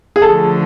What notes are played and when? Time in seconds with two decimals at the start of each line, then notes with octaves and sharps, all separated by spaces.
0.16 G#4
0.22 D3 F3 A3 A4